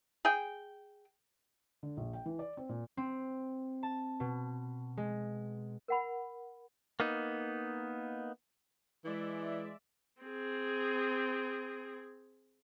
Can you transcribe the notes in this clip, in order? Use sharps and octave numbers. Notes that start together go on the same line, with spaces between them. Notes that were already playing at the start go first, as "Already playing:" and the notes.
G#4 G5
D3
A#1
G5
E3
D5
C4
A#2
C4
A5
B2
G#3
A#4 F#5 B5
A#3 B3 D#4
E3 G#3 D5 E5
C4 G#4